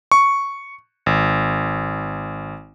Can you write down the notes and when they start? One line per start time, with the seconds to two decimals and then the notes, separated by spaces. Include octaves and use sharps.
0.12 C#6
1.06 G#1